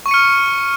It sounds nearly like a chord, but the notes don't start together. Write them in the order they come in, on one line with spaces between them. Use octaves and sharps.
C#6 D#7 C#7 F6